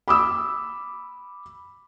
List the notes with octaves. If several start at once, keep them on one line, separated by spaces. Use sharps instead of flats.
B5 D6 E6